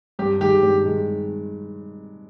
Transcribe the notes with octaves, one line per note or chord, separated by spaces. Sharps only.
G2 G4
D#3 G#3 G4
G2
D#3 G#3